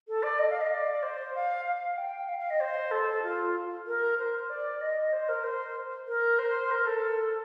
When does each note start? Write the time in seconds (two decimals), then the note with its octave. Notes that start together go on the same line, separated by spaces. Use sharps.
0.08 A4
0.23 D5
0.38 D#5
0.50 F5
0.61 D#5
0.71 D5
1.02 C5
1.34 F5
1.65 F5
1.97 G5
2.28 F5
2.38 F5
2.50 D#5
2.60 C5
2.91 A4
3.22 F4
3.86 A#4
4.18 C5
4.49 D5
4.81 D#5
5.12 C5
5.29 A#4
5.43 C5
6.07 A#4
6.39 C5
6.71 A#4
6.86 A4